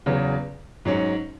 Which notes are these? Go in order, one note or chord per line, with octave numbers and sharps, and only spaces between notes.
E2 C#3 F#3 B3
G#2 F#3 C#4